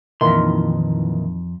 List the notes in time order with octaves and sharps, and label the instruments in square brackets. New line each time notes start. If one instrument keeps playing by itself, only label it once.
[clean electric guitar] F2 C6 [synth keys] A#2 D#3 E3